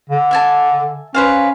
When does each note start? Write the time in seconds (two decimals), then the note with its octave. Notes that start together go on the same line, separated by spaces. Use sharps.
0.10 D3
0.31 E5 G#5 A5
1.14 C#4 B4 C5 F5